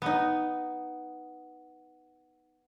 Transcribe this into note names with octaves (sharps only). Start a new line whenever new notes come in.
B3 D#4